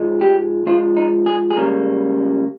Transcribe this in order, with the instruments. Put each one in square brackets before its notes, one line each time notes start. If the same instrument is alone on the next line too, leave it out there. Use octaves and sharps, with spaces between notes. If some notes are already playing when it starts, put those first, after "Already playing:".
Already playing: [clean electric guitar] G#2 F3 G#3
G4
G#2 F3 G#3 F4
D#4
G#4
G#4
C#2 C#3 G3 A#3 A#4